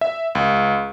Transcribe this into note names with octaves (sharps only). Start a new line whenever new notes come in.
E5
C#2